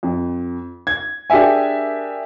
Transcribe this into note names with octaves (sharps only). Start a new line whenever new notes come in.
F2
G#6
D4 G4 G#4 A#4 E5 G#5